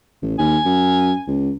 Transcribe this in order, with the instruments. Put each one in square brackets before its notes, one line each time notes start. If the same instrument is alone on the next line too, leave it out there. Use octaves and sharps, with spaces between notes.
[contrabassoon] A1
[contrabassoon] D#2 [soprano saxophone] G#5
[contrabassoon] F#2
C#2